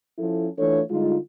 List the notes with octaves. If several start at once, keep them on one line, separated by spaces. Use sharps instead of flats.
F3 C#4 E4 A4
E3 A3 D4 F4 A4 C#5
D3 G3 G#3 D#4 F4